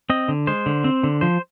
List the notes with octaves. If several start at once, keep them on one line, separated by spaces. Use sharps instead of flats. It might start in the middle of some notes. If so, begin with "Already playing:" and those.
C4 D#5
D3
G#3 C5
D3
C4
D3
F3 C5